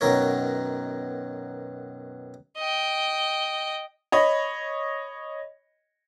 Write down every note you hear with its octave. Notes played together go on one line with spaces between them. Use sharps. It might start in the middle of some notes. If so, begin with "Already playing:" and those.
F#2 B2 D#3 A#4 C#5
D#5 G5
C#5 D#5 B5